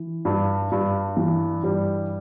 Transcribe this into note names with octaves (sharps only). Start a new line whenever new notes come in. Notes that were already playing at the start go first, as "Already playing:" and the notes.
Already playing: E3
G2
G2
E3
G2 G3